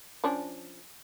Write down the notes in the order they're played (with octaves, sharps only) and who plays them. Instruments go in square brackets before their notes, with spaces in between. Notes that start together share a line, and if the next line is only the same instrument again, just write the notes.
[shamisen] F3 C#4 D4